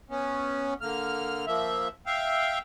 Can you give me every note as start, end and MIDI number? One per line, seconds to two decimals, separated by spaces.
0.10 0.74 59
0.10 0.74 61
0.81 1.45 50
0.81 1.45 58
0.81 1.45 89
1.47 1.88 53
1.47 1.88 58
1.47 1.88 76
2.06 2.59 76
2.06 2.59 77
2.06 2.59 79